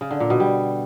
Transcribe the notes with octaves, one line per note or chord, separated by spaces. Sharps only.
C#3
D3
A#2
B2
G3